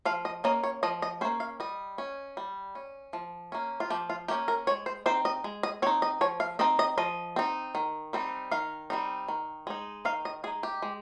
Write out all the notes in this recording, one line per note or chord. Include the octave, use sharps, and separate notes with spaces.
F3 F5
D#5
A#3 C#4 D#5
C#5
F3 D#5
D#5
A#3 C#4 C5
F5
G3 D#5
C#4
G3
C#4
F3
A#3 C#4
F4
F3 G4
F4
A#3 C#4 G4
A#4
G#3 C#5
C5
C4 D#4 C5
D#5
G#3
D#5
C4 D#4 C#5
D#5
F3 C#5
F5
C4 D#4 D#5
D#5
F3 D#5
C4 D#4
D#3
G3 C4 D#4
D#3 F5
G3 C4 D#4
D#3
G#3 D#4
D#3 F5
D#5
G#3 D#4 G#4
G4
G#3